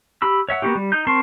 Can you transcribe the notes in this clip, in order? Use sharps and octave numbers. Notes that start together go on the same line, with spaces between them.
G4 B5 E6
C#5 E5 F#5
A#3 B3 D#4 F#4 G4
G3
D#4 G6
C4 A#4 A5 C6 C#6